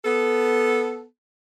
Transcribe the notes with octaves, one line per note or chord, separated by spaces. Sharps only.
B3 A4